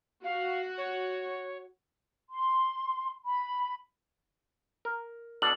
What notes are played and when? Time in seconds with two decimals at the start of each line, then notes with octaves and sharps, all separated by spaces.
0.24 F#4 F5
0.78 C#5
2.30 C6
3.25 B5
4.85 A#4
5.42 B2 D4 A4 F#7